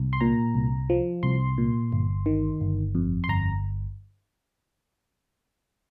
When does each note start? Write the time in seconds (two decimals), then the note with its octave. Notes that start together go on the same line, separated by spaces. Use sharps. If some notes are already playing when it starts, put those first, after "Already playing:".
Already playing: C2
0.13 C6
0.20 A#2 A#5
0.55 C2
0.90 F3
1.23 C2 C6
1.58 A#2
1.92 G1
2.26 D#3
2.61 G1
2.95 F2
3.24 C6
3.29 G1 A#5